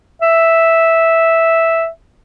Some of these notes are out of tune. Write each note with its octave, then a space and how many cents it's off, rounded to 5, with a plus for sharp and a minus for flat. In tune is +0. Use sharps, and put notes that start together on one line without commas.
E5 -5